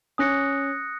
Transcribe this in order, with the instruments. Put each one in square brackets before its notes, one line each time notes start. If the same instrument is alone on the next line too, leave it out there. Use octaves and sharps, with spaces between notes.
[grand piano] C#4 [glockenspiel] D#6 F#6 A#6 C#7